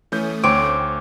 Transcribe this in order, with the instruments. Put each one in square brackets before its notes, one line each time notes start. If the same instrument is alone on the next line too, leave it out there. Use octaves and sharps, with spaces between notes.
[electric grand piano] E3 C#4 G6 [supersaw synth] A3 D#6
[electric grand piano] D2 C#5 [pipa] C4 [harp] D6